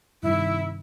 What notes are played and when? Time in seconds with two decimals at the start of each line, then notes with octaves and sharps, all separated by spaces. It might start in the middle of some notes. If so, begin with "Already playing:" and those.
0.23 G2 C3 D#3 E4